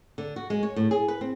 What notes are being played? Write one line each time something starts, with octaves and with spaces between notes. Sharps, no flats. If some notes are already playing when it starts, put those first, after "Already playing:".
D3
F#4
G#3
C#5
A2
G#4
B4
C4